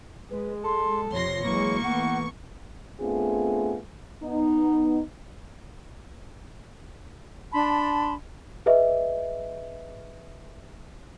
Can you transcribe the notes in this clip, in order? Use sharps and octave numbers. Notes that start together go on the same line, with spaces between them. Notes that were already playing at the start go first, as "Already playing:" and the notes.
G#3 B4
A4 C6
F2 C3 F3 C#5 C6 A#6
E3 F#3 G#3 A#3 C#6
E3 A3 B3 F#5
A3 B3 C4 D4 F4 G#4
B3 D#4
D4 A5 B5 C6
G#4 B4 D#5 E5